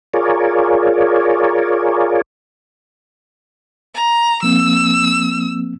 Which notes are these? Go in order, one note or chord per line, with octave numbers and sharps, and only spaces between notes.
F4 G#4 A#4 C#5 D5
A#5
F3 A#3 C4 E6